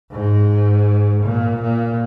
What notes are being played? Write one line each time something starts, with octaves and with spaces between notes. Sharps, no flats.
G#2
A#2
A#2